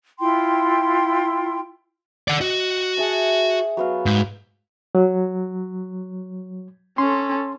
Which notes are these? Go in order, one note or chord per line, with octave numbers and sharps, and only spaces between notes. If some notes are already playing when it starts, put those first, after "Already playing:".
E4 F4 G5 C6
D5 F#5
F#4 D#5
G#4 E5 A5
F#3 B3 F5
G#2
F#3
C#4 A4 C6